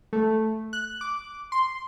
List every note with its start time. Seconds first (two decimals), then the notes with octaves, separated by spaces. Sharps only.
0.13 A3
0.73 F#6
1.01 D6
1.52 C6